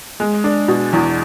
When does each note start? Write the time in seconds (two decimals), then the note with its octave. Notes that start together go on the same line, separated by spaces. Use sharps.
0.20 G#3
0.44 D4
0.68 B2
0.93 E2